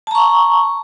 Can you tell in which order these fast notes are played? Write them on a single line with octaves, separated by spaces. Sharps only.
A5 A#5 C#6